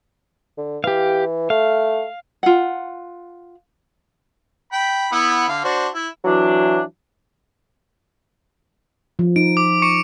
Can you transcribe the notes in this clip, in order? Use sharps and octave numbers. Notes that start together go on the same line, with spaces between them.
D3
E3 G4 F5
A3 F5
F4 F#5
G5 B5
B3 E4 F#5
D3 F5
D4 F#4 C5
E4
E3 F#3 D4
F3
D#4 D7
D6
C#6 C#7